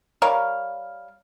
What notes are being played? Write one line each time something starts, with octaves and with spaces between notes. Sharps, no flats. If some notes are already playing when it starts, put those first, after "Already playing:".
G3 A#4 C#5 F5